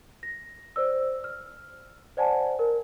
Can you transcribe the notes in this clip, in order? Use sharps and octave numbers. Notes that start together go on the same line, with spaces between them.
A#6
C5 D5 E6
F6
C5 D5 F#5 G#5 A5
A#4